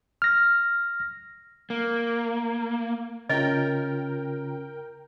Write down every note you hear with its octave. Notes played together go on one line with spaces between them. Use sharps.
F6 A#6
A#3
C#3 C#4 F4 A#4 D#5 G5